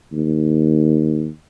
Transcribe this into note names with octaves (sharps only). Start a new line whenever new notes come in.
D#2